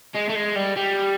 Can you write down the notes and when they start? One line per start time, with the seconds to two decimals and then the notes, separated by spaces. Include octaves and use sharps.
0.15 G#3
0.29 A3
0.35 G#3
0.56 G3
0.76 G3